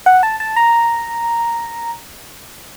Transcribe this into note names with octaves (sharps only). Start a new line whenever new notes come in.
F#5
A5
A5
A#5